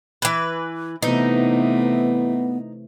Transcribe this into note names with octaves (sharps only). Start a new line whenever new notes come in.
E3 B4
C3 E3 A3 B3 D#4